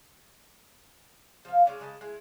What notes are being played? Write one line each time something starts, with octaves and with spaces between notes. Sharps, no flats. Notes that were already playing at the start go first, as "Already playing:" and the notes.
F3 F5
G#3 C#4 D4
C#3 G#3 D#5 A5
G#3 E4